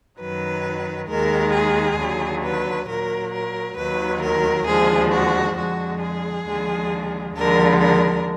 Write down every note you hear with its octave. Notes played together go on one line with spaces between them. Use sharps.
F#2 D#3 F#3 B4
D#2 D#3 G#3 A#4
G#4
D#2 D3 F#3
B4
A#2 F#3 A#4
A#4
D#2 D#3 F#3 B4
A#4
D#2 D3 F3 G#3 G#4
F#4
F2 D3 G#3 F#4
G#4
D#2 D3 F3 G#3
D#2 D3 F3 G#3 A#4
A#4